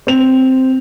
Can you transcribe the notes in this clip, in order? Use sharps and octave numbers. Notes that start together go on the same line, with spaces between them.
C4 F7